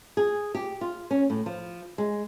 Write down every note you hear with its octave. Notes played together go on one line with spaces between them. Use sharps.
G#4
G4
F4
C#4
A2
F3
G#3